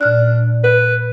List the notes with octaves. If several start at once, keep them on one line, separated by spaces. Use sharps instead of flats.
A#2 D4 F6 F#6
B4